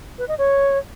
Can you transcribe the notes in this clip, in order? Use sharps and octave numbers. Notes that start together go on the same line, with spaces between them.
B4
D#5
C#5